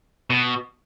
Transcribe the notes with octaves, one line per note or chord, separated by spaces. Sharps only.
B2